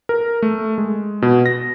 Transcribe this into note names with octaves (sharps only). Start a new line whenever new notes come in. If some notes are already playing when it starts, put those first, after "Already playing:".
A#4
A3
G#3
B2
A#6